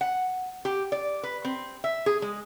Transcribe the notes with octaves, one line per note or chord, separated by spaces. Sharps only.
F#5
G4
D5
B4
C4
E5
G#4
G#3